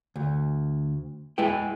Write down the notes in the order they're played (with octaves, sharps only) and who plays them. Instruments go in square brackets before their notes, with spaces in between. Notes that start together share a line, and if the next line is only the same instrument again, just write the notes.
[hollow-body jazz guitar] D2
G#3 E4 B4 G5